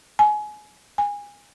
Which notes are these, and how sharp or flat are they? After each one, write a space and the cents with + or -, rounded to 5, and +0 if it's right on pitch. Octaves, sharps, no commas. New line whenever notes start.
G#5 +25
G#5 -25